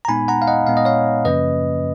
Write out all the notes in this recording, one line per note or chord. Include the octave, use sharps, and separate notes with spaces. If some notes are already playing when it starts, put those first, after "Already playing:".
A#5
A#2 G#3 B3 D#4 G#5 B5
F#5 A#5
F5
D#5 F#5
A#2 G#3 B3 D#4 F5
D#5
C#5 F5
F#2 C#3 F3 A#3 C#4 B4 D#5